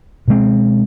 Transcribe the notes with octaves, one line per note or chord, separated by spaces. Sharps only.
B2 G#3 C4